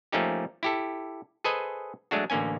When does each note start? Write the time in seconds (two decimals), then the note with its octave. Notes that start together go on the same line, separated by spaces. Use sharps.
0.12 F3 A3 A#3 C#4 D#4 G4
0.63 E4 G4 A4
1.44 G#4 A4 B4 C5 D#5 G#5
2.11 F#3 G#3 A3 D4 F#4
2.30 A1 D3 A#3 C#4 G#5